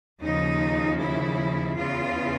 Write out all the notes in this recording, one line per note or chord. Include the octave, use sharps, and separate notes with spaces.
D#2 C#3 F3 D#4
E4
E2 C#3 E3 F4